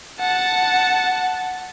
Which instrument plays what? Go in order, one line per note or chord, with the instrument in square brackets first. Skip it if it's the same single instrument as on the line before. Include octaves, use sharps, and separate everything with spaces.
[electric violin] F#5 A5